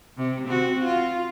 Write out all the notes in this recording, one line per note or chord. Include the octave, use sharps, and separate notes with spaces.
C3
C4 F#4
F4